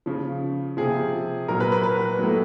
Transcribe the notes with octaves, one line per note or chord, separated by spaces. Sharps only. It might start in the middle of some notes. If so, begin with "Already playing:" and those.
C#3 F3
C3 F3 G#4
A#2 F#3 A#4
B4
B4
B4
A2 F#3